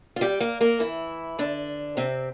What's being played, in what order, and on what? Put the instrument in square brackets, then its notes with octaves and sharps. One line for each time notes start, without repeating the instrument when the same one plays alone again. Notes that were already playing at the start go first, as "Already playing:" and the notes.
[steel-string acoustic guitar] F4
G3 G4
A#3 A#4
A#3 A#4
E3 E4
D3 D4
C3 C4